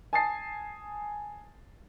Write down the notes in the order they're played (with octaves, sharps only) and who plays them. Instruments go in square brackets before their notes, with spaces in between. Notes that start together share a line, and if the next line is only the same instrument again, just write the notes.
[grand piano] G#5 A5 D#6 A6 C7